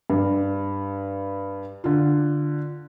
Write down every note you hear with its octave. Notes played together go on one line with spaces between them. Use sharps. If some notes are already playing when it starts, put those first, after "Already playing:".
G2
D3 F4